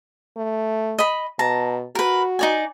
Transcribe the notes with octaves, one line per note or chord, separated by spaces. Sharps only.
A3
D#5 B5
B2 A5 A#5
F#4 A#4 B4
D#4 D5 G#5